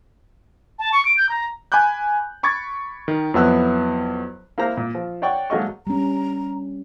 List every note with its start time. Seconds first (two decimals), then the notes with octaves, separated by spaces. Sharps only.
0.79 A5
0.92 C#6
1.05 D7
1.17 G6
1.29 A#5
1.72 G#5 B5 D6 F#6 G6
2.43 B5 C#6 D6 G#6 A6
3.08 D#3
3.34 F2 F#3 B3 E4 E6 F#6
4.58 A#3 E4 A#4 C5 A#5
4.77 A#2
4.95 F3
5.22 C#5 D5 F#5 G5 C#6
5.50 G#2 F#3 A3 A#3 D#5 C#6
5.87 G3 C#4 A#5